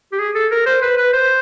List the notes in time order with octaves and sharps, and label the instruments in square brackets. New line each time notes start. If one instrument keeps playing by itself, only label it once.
[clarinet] G4
G#4
A4
A#4
C5
B4
B4
C5